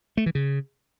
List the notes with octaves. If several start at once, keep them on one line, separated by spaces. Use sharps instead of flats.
A3
E3
C#3